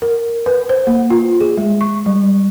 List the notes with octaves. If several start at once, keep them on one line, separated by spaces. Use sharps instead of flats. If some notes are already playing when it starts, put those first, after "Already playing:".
A#4
B4
C5
A#3
F4
G#4
G#3
C#6
G3